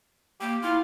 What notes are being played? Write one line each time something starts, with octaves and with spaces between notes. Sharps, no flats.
A#3 G4
E4 F4